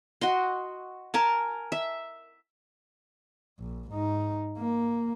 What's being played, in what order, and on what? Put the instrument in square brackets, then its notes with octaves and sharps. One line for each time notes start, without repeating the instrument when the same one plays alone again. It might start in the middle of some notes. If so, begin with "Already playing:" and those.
[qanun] F#4 D#5 C6
A#4 G#5 A5
E5
[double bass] A#1
G#2 D#4
A#3